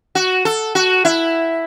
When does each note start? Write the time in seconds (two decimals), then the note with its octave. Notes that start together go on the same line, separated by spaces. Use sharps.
0.15 F#4
0.45 A4
0.75 F#4
1.05 E4